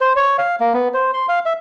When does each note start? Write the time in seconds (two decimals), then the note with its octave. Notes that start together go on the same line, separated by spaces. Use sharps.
0.01 C5
0.16 C#5
0.38 F5
0.60 A#3
0.74 B3
0.94 C5
1.14 C6
1.29 F5
1.46 E5